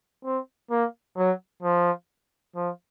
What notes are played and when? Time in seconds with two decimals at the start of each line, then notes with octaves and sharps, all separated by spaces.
0.24 C4
0.71 A#3
1.17 F#3
1.63 F3
2.55 F3